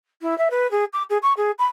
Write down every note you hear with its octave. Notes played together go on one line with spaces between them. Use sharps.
E4
E5
B4
G#4
D6
G#4
C#6
G#4
B5